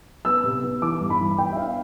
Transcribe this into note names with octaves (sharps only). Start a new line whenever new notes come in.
B3 E6
C3
B3
E3 D6
G2
B5
E3
B3 G5
E5
D4 F5